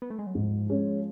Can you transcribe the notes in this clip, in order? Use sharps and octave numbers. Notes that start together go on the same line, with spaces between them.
B3
A3
G#3
F#3
G#2 F3
G#3 C#4